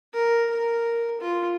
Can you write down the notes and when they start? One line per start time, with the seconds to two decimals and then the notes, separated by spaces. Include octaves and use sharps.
0.14 A#4
0.51 A#4
1.21 F4